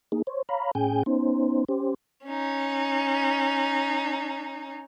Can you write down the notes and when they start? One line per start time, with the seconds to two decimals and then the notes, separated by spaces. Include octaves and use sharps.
0.12 A#3 D#4 G#4
0.27 C5 C#5
0.49 C#5 F5 A#5 B5
0.75 A2 C#4 G#4 G5 G#5 G6
1.06 B3 C#4 D#4 C5
1.68 C#4 G4 C5
2.26 C#4 D#4